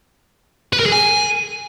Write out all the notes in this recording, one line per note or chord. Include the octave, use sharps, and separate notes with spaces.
B4
A#4
G#4
G#5